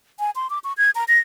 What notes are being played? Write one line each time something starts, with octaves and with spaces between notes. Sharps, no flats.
G#5
C6
D6
C#6
G#6
A#5
A#6